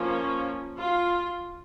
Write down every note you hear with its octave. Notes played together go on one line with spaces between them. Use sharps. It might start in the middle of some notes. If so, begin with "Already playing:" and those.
Already playing: F3 A#3 C#4
F4